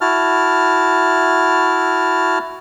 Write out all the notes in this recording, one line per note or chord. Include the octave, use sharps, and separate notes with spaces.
E4 F#4 A5 F6